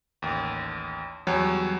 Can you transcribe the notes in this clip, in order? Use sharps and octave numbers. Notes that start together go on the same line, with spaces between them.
A1 D#2
E2 F#3 G3 C#5